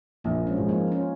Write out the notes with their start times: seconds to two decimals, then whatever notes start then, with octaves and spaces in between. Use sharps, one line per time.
0.24 A#1 F3 A#3
0.47 G#3 C#4
0.58 G#2 F3 G#3
0.69 A#3 D#4
0.92 C#4 F4